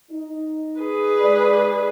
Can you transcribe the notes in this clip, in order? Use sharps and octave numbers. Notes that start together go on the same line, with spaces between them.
D#4
G#4 B4
G#2 D5